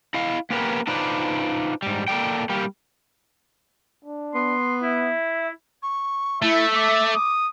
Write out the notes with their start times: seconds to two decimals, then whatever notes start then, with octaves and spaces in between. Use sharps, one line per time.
0.14 E4 D#5 F5
0.50 A#3 B3 C#4 G4 A#4 B4
0.87 D4 D#4 F4 B4 C5 D5
1.82 G#2 G3
2.08 A#3 A4 D5 G5
2.49 G3 A#3 G4
4.05 D4
4.35 B3 C6
4.83 E4 E5
5.82 C#6
6.42 A3 E4 E5
6.75 D6
7.15 D#6